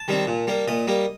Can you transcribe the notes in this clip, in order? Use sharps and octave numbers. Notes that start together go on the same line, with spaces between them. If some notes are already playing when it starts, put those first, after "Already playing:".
Already playing: A5
D#3 G3 C4
A#2
G3 A#3
A#2 D#5
G3 A#3